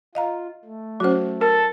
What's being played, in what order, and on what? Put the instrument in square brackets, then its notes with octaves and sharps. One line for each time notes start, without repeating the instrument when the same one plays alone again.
[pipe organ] F4 [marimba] D#5 F5 A#5
[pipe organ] A3
[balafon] F#3 C#4 [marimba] F#4 C5
[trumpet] A4 [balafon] A#4